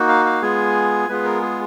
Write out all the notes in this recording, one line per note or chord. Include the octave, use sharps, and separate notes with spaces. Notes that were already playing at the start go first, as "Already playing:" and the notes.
Already playing: A#3 D#4 F#4
F5
F5
G#3 B3 F4 G#4 G#5
G#3 B3 F4 G#4 B4
A#4
G#4